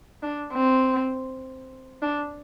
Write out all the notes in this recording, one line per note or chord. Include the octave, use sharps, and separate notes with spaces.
D4
C4
D4